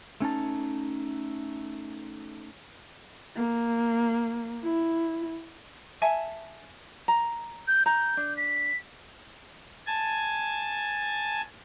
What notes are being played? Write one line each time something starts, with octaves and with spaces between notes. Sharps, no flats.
A3 C#4 D#4 A5
A#3
E4
E5 G#5 A5
A#5
G6
A#5 G6
D4
B6
G#5 A5